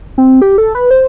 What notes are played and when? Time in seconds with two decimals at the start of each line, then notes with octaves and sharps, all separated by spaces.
0.18 C4
0.42 G4
0.58 A4
0.75 B4
0.91 C5